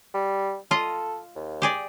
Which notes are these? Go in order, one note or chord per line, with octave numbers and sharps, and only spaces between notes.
G3
F4 A4 D#5
D#2
G4 G#4 D5